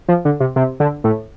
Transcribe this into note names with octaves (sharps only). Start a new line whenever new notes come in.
F3
D3
C3
C3
D3
A2